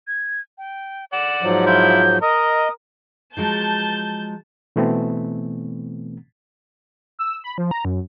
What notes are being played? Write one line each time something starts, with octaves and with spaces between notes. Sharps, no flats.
G#6
G5
D5 F#5 E7
G#2 F3 F#3
E4 F4 G6
A#4 D#5 D#6
F3 F#3 G#3 A5 G6
B2 E3 A3 B3 C4
E6
B5
F3
A#5
F#2